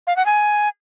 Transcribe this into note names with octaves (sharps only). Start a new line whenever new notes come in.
F5
F#5
G#5